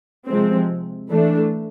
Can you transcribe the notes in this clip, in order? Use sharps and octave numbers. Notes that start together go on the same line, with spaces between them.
C3 F3 G#3 C4
E3 A3 D4